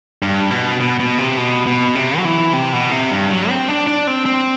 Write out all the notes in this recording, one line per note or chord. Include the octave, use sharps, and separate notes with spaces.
G2
B2
B2
B2
C3
B2
B2
C3
F#3
E3
C3
B2
C3
G2
F#3
C4
D4
D4
C4
C4